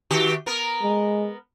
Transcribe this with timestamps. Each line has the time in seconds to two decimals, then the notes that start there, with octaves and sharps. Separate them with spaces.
0.11 D#3 F#4 G4
0.46 B3 A#4
0.82 G#3